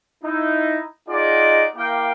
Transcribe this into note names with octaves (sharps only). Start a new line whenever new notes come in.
D#4 E4
D#4 F4 G#4 D5 D#5 F#5
A#3 E4 A#4 F5 G5 D6